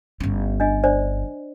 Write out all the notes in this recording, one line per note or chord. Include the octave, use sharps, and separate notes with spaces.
G1 C#4
D4 D#5 G#5
D4 C5 D5